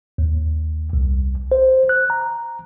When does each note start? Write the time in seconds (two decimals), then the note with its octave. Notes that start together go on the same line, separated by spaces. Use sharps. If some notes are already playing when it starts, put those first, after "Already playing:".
0.18 D#2
0.93 C2
1.52 C5
1.89 F#6
2.10 A#5